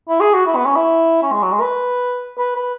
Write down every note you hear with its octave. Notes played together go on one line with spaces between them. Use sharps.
E4
G#4
F#4
E4
B3
C#4
E4
C#4
G#3
F#3
G#3
B4
B4
B4